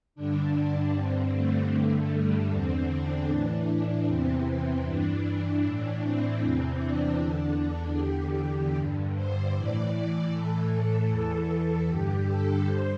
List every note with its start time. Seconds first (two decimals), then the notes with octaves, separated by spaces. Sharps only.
0.15 G2 D3 D4
0.93 G2 D3 C4
1.32 A3
1.72 G2 D3
2.10 G3
2.50 E2 D3 C4
2.89 D4
3.28 A2 E3
4.06 E2 C3 E3 C4
4.84 G2 E3 D4
5.63 A2 E3 D4
6.01 C4
6.41 E2 C3 E3
6.80 D4
7.19 E2 D3
7.97 E2 D3 G4
8.75 G2 D3
9.15 C5
9.54 A2 E3 D5
10.32 A2 E3 A4
11.10 E2 E3
11.88 G2 D3 G4
12.28 A4
12.66 G2 C5